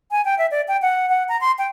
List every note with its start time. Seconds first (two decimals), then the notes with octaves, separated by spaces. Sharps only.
0.11 G#5
0.25 G5
0.38 E5
0.51 D5
0.68 G5
0.82 F#5
1.09 F#5
1.29 A#5
1.41 C6
1.59 G5